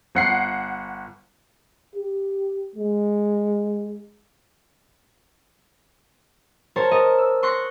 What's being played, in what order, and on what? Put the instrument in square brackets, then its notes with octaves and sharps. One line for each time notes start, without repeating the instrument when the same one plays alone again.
[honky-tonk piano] G1 F#5 C7
[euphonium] G4
G#3
[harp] A#4 C5 C#5 A5
A#4 D#5 A5
E6
C6 C#6 F#6 A#6 C7